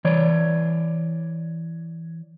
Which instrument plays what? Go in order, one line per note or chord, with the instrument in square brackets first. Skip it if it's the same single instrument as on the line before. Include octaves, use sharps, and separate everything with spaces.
[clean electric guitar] E3 C#5 D5